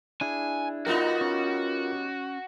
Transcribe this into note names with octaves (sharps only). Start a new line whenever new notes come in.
D4 E4 G#4 G#5
G3 B3 D#4 F4 F#4 A#4
C#4